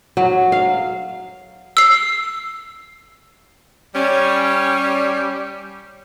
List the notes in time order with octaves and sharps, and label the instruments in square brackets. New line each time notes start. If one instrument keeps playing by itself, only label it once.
[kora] F#3
F5
[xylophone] E6 C7
[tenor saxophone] G3 [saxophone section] C#4